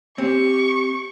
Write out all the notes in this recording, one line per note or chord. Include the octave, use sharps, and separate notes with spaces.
C4 G4 C#6